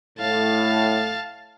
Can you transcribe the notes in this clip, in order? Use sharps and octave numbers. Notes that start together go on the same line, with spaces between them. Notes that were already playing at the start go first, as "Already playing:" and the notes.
A2 F5 A5